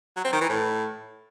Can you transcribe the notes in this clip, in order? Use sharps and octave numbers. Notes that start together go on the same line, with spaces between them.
F#3
C4
D#3
E3
A2